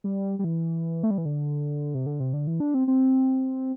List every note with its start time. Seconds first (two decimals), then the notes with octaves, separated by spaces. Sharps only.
0.04 G3
0.39 G3
0.44 E3
1.03 A3
1.11 G3
1.18 E3
1.25 D3
1.94 C3
2.06 D3
2.20 C3
2.33 D3
2.47 E3
2.60 D4
2.74 C4
2.88 C4